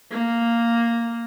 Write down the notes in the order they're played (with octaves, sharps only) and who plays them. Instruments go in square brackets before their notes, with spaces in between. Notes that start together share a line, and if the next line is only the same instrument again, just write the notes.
[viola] A#3